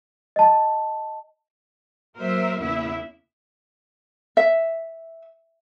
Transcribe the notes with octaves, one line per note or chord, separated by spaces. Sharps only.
D#5 A5
F#3 A#3 A#4 C5 E5
E2 C#3 A#3 B3 E4 E5
E5